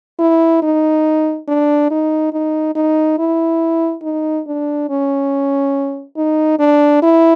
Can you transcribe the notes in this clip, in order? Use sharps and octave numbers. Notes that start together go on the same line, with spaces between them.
E4
D#4
D4
D#4
D#4
D#4
E4
D#4
D4
C#4
D#4
D4
E4